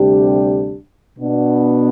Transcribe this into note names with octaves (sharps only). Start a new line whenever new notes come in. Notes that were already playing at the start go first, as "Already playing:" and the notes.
Already playing: D2 C3 G3 D4 G4
B2 B3 D4